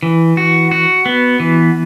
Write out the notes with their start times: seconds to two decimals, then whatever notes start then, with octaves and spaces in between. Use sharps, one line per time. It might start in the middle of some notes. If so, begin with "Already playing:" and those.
0.03 E3
0.37 F#4
0.71 F#4
1.06 B3
1.40 E3